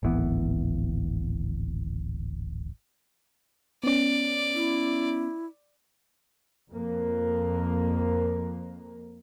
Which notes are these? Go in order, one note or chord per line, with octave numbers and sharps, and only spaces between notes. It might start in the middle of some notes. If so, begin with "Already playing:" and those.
D1 G#1 E3 B3
B3 C#4 D5
E4
F2 A#3